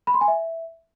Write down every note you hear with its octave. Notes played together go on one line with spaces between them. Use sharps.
B5
C6
G#5
E5